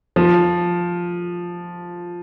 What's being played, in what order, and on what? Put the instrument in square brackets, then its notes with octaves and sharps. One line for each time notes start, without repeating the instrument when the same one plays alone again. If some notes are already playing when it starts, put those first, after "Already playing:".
[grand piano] F3